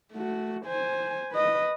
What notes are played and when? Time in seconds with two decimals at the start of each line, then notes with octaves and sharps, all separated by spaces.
0.13 A3 F#4
0.66 C5 G#5
1.32 B4 D#5